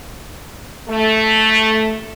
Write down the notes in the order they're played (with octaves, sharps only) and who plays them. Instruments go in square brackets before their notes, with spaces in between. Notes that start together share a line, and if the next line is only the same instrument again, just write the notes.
[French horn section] A3